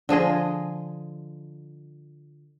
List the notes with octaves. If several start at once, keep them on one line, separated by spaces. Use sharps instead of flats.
D3 F3 G#4 D#5